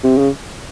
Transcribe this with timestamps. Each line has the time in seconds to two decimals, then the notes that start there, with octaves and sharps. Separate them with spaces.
0.04 C3
0.18 C#3